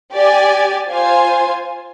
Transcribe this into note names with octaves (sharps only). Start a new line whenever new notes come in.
G4 D5 G#5
F4 C5 F5 G#5